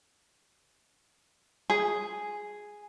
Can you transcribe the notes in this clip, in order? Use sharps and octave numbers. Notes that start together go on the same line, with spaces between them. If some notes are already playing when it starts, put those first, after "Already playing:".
G#4